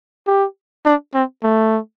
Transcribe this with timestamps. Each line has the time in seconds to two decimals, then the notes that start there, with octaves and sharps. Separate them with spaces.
0.27 G4
0.86 D4
1.14 C4
1.44 A3